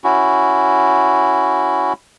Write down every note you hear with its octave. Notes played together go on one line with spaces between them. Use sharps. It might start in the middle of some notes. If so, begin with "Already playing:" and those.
C#4 E4 F#4